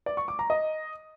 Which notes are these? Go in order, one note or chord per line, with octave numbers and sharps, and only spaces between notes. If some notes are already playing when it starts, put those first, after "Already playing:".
D5
C#6
D6
A#5
D#5